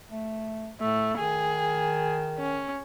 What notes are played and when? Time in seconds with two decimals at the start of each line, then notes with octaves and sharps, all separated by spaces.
0.10 A3
0.81 A2 A3
1.18 D#3 G#4
2.39 C#4